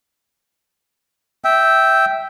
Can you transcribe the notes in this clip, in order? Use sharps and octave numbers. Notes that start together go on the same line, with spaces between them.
E5 G5